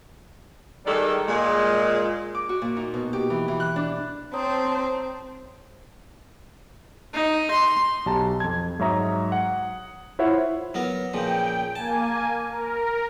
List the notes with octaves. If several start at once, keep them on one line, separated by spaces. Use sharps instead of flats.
D#3 G3 G#3 D4 A4
A#2 G#3
D6
F#4
A#2
D#4
B2
G4
E3
E3
F#6
D4
C4 C5 C#5 A5 A#5 D#6
D#4
C6
B1 G4 A5 A#5
F2 G#6
G#2 F#3 C#5 E5 A#5 D#6
F#5
E4 F4 C5 C#5 E5 F#5
F#3 B3 A#4
A#2 C#3 F3 G5
A#3 G#5 A5
A#4